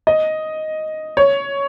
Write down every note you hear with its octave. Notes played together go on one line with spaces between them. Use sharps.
D#5
C#5